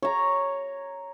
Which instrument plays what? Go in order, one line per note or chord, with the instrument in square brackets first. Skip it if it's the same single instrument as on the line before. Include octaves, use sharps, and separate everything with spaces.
[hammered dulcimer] C#5 A#5